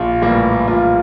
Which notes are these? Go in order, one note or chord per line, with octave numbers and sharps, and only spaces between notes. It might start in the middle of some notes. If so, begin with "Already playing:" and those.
Already playing: A#1 F4
A2 E3 G3 A#3
A#1 F4